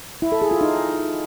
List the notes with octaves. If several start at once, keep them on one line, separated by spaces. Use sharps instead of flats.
E4
A4
G#4
F4
D#4